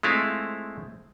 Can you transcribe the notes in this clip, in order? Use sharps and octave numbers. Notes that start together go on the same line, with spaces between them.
G#3 A3 C4 E4 F4 F5